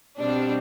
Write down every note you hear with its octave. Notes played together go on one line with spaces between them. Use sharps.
B2 G3 C4 D4